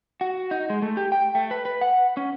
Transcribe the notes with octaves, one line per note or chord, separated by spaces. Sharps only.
F#4
D#4
G#3
A3
G4
G5
A3
B4
B4
F#5
C#4